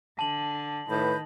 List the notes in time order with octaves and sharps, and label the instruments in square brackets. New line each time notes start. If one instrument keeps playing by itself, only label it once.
[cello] D3 [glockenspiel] A5 F#7
[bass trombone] A2 [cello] D#3 [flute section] B4 B5 G6